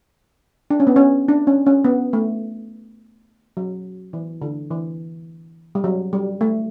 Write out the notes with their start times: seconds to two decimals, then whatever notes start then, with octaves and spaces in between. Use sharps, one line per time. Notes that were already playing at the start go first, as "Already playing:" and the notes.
0.70 D4
0.80 C#4
0.87 B3
0.96 C#4
1.29 D4
1.47 C#4
1.66 C#4
1.85 B3
2.13 A3
3.57 F#3
4.13 E3
4.42 D3
4.71 E3
5.75 G3
5.84 F#3
6.13 G3
6.41 A3